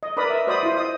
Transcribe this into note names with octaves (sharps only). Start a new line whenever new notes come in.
D#5
A#4 B4 D5 B5 D#6
E5
F#4 C5 D5 D#5 B5 D#6
E4 F4 C5
D#5 D#6